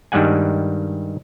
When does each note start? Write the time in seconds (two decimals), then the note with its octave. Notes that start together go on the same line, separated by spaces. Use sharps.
0.12 G2 D#3 G3 G#3 F#5 G#5